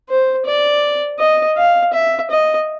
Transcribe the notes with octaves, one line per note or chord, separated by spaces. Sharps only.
C5
D5
D#5
F5
E5
D#5